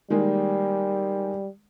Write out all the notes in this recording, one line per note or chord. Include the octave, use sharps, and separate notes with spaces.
D#3 G3 G#3 A#3